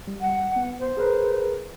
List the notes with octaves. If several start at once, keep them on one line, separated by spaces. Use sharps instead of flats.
G3
F#5
B3
C5
G#4 A#4 B4